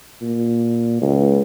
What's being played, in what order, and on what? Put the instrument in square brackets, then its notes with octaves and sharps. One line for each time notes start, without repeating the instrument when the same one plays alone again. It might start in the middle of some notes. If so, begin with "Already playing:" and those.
[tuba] A#2
C#2